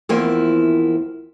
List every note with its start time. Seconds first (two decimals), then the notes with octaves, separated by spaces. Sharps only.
0.09 E2 F3 A#3 C4 E4